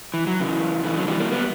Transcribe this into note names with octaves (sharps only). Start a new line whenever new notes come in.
E3
F#3
C#3 E3
C#3 E3
D3 F#3
E3 G3
F#3 A#3
G3 B3